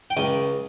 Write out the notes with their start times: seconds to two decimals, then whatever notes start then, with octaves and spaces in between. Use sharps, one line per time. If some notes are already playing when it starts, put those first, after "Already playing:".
0.10 G5
0.17 C#2 G#5